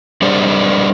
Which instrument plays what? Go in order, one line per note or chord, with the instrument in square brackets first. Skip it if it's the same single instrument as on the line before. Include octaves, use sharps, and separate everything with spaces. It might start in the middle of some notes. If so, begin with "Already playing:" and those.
[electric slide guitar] G3 D4 G#4 C5 D5